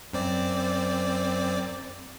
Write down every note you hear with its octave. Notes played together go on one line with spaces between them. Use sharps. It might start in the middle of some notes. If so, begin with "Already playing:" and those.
F#2 C4 D5